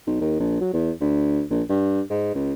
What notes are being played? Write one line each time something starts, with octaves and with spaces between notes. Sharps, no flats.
B1
D#2
A#1
F#3
E2
D2
A#1
G2
G#2
C#2